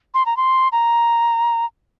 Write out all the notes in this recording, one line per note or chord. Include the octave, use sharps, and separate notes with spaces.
C6
A#5
C6
A#5